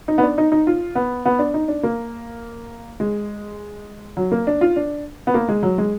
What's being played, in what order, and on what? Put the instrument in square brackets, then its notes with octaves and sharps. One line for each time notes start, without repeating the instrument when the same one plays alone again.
[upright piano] D#4
B3
D4
D#4
D#4
F4
B3
B3
D4
D#4
D4
A#3
G#3
F#3
A#3
D4
F4
D4
B3
A#3
G#3
F#3
G#3